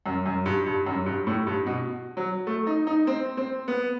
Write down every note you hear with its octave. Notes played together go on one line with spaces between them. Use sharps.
F#2
F#2
G2
G2
F#2
G2
A2
G2
B2
F#3
A3
D#4
D#4
C4
C4
B3